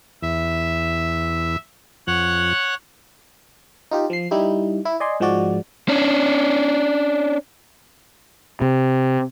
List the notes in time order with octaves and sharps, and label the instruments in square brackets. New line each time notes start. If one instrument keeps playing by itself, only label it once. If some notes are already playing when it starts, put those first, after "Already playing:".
[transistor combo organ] E2 [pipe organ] E5
[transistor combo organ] F2 [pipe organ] C#5 F#5 F#6
[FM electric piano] D#4 F4 G4
F3 C7
G3 D#4 E4 G4
E4
D5 D#5 G#5 C6
G#2 F3 G#3 F#4 D5
[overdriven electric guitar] C#4 D4
[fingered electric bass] C3